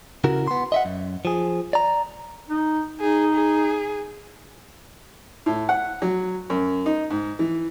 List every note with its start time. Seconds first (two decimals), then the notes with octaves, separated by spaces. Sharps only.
0.24 C#3 E4 F#4 A#4
0.48 B3 C6
0.72 D#5 E5 F#5
0.85 F#2
1.25 F3 G#4
1.73 D5 A#5
2.49 D#4
3.00 D#4 G#4
3.34 G#4
5.46 A2
5.69 F#5
6.02 F#3
6.50 F#2
6.86 D#4
7.10 G#2
7.39 E3